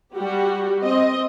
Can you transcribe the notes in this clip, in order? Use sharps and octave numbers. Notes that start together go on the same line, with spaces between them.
G3 F#4 G4
C4 D#5